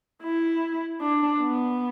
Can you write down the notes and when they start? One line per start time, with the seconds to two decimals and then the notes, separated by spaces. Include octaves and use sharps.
0.23 E4
1.01 D4
1.41 B3